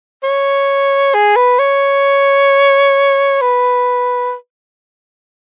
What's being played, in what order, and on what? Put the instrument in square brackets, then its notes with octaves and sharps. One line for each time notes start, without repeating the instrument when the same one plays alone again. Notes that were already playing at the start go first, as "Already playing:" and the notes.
[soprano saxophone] C#5
G#4
B4
C#5
B4